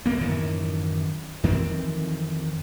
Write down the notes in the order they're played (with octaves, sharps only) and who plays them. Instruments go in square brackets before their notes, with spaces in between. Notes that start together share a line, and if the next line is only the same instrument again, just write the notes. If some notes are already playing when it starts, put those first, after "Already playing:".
[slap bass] D1 A#1 A#3 B3
F#2 A2 D#3 E3
F2 D#3 E3 C4